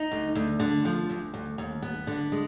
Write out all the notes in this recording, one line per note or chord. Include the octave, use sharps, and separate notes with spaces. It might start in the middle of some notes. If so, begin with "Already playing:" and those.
Already playing: D#4
D2
D2
D3
F3
D2
D2
D#2
B3
D3
G#3